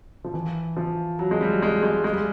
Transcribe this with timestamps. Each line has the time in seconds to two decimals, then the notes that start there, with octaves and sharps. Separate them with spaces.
0.25 F3
0.34 E3
0.77 F3
1.19 F#3
1.31 G#3
1.41 G3
1.63 G#3
1.83 G#3
2.04 G#3
2.13 G3